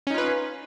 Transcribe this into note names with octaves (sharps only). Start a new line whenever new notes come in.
C#4 D#4 F4 B4